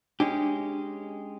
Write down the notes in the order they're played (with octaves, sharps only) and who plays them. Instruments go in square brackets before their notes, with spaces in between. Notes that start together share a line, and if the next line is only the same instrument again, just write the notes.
[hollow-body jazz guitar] G#3 C#4 G4 [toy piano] D4